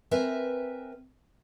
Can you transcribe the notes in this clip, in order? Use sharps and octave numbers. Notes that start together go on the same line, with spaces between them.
C4 A#4 B4 E5 G#5